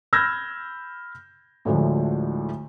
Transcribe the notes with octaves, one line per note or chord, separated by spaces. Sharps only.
B5 E6 F6 G6 G#6 A#6
D2 A2 D3 F3 G#3